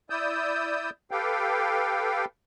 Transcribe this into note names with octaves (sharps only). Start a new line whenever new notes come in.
E4 D5 D#6 E6 G6
G4 A4 B4 F5 G5